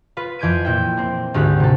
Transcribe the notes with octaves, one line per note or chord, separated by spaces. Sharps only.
F4 B4
F2 E3 G6 G#6 D7 D#7
A#2 E4 E5 G5
A#3 C4
G#1 D2 G4 F#6
C3 A4